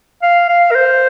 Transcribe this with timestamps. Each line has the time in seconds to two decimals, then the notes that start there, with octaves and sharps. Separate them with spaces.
0.22 F5
0.49 F5
0.71 A#4
0.75 C5